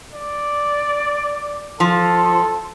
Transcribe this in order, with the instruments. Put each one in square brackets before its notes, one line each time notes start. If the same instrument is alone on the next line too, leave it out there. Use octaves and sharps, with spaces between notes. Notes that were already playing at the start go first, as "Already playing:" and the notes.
[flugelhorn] D5
[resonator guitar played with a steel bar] F3 [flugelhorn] A4